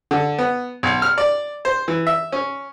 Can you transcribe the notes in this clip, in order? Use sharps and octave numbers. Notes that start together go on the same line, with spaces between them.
D3
B3
B1
F6
D5
C5
E3
E5
C#4